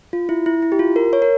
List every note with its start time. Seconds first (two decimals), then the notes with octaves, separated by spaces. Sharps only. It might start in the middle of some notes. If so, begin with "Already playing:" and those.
0.13 F4
0.29 E4
0.46 E4
0.62 E4
0.72 G4
0.79 F4
0.96 A#4
1.13 C#5
1.22 A#4